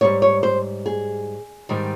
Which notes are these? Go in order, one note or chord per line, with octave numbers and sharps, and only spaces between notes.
G#2 G3 C#5
C#5
C5
G#4
G#2 D#3 G3